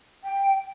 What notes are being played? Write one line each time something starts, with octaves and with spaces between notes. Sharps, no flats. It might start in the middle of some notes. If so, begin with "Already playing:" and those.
G5